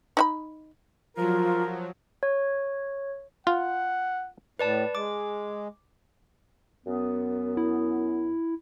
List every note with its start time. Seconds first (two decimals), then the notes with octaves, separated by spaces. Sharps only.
0.17 D#4 E5 B5
1.17 F3 F#3 F4 A#4
2.23 C#5
3.47 F4 F#5
4.59 A2 B4 D5 A5
4.95 G#3 D6
6.86 F#2 B3
7.57 E4